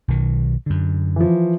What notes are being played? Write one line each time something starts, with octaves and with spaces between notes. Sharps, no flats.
B1 D#3
F#2 D3
E3 F3